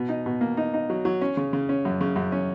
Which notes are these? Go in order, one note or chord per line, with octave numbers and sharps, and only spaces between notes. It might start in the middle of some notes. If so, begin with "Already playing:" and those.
Already playing: B2
D#4
B2
A#3
D#4
D#4
F#3
F#3
C#4
C#3
C#3
C#4
F#2
C#3
F#2
C#4